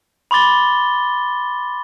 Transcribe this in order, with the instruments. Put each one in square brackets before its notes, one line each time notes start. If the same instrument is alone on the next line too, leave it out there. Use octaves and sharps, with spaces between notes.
[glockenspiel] B5 C6 D6 A6 G7